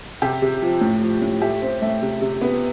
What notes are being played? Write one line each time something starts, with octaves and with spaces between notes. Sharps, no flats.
C3 G4
C3
F3
A2
F3
A2
A3 G4
C4
A3
C3
C3
B3